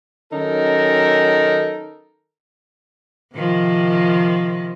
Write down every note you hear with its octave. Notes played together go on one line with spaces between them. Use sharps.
D#3 F#3 C#4 D#4 A4 A#4
C3 D#3 F3